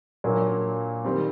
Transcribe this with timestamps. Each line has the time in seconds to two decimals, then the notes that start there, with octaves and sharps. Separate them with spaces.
0.24 A#2 F#3 A#3 D4
1.05 D#3 G3 C4